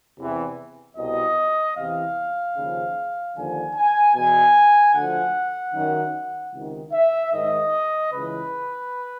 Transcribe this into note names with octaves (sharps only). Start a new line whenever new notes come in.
E2 C3 E3
C2 B2 D#5
E2 C3 E3 F5
D#2 C#3 F3
D#2 D3 F3 G#5
G#5
E2 B2 G#5
D2 D3 F3 F#5
F#2 D#3
C#2 C3 D#3
E5
G#2 D#3 D#5
C#2 C#3 E3 B4